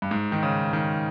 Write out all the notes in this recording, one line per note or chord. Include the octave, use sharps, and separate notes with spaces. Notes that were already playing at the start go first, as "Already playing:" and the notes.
G2
G#2
D#3
C#3
D#3